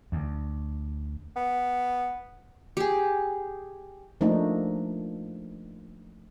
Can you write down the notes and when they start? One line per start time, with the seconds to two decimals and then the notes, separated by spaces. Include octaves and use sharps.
0.12 D2
1.36 B3
2.77 G4 G#4
4.21 F3 A3 A#3 D4 D#4